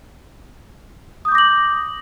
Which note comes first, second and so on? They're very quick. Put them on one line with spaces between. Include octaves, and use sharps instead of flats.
D#6 G6 D6 A#6 F#7